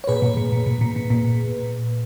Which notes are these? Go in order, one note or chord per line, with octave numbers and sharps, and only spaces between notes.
C#5
A#2 G#4 B4
A#2
A#2
A#2
A#2
A#2
A#2
A#2